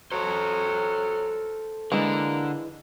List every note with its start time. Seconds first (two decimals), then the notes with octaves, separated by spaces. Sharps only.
0.12 F#3 A4 C5
1.92 D3 E3 G#3 A#3